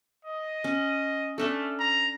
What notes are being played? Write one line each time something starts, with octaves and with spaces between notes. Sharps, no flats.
D#5
C#4
A3 C#4 D4 A4
A#5